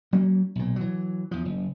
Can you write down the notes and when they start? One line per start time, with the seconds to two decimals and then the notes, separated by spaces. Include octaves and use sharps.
0.13 F#3 A#3 C#4
0.56 B1 A#2
0.76 E3 F#3
1.31 E2 F3
1.45 F#1